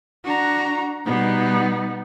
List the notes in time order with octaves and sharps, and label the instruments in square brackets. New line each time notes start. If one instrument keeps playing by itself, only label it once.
[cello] D4 [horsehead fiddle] F#4 A#5
[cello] B2 G3 [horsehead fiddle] B3 D#4